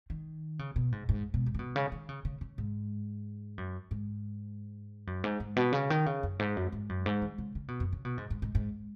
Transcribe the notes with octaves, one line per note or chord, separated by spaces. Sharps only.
D#3
C#3
B2
G#2
G#2
B2
G#2
C#3
B2
C#3
D#3
C#3
C#3
C#3
G#2
F#2
G#2
F#2
G#2
G#2
B2
C#3
D#3
C#3
F#2
G#2
F#2
G#2
F#2
G#2
D#3
C#3
C#3
B2
F#2
C#3
B2
G#2
G#2
G#2
G#2